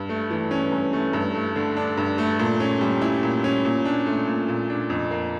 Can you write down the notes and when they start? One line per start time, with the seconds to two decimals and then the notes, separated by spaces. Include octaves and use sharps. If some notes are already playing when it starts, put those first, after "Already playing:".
Already playing: G2
0.09 A3
0.30 E3
0.51 C#4
0.72 G2
0.93 A3
1.13 G2
1.35 A3
1.56 D3
1.77 D4
1.97 G2
2.18 A3
2.39 A#2
2.60 C#4
2.81 G3
3.02 E4
3.23 A#2
3.44 C#4
3.65 A#2
3.85 D4
4.06 A3
4.27 A#2
4.48 A#2
4.70 D4
4.90 F2
5.11 A#3